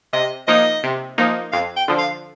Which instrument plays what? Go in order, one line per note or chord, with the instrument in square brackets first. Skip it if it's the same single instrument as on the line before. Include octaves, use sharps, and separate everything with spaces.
[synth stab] C3 [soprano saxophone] D#5
[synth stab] F3 A#3 D#4 [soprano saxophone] D#5
[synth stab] C3
F3 A#3 D#4
[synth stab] F2 [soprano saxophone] F5
[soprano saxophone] G5
[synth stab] D3 F3
[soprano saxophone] F5